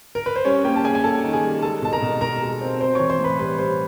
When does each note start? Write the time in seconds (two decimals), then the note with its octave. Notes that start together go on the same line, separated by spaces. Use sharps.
0.15 A#4
0.26 B4
0.36 C5
0.45 G3 C#4 C#5
0.64 A#3 G4 G5
0.76 A5
0.84 A#3 G#4 G#5
0.95 G#5
1.04 A#3 A4 A5
1.24 D#3
1.33 G#4 G#5
1.43 G3
1.62 G#3 A4 A5
1.82 B2 A5
1.93 A#4 A#5
2.02 B2
2.21 B2 A#4 A#5
2.42 G#3
2.61 C4
2.80 C4 C5 C6
2.95 E3 C#5 C#6
3.10 C5 C6
3.19 A2
3.24 B4 B5
3.39 G3 B4 B5
3.59 G3 C5 C6